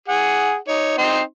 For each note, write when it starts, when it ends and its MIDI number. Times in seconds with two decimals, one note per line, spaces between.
0.08 0.55 68
0.08 0.55 78
0.68 0.97 63
0.68 0.97 73
0.98 1.20 60
0.98 1.20 63
0.98 1.20 84